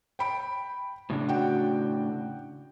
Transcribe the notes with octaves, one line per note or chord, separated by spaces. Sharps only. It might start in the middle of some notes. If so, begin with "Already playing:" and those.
G5 B5 D7
A2 C#3 D4
F#4 G5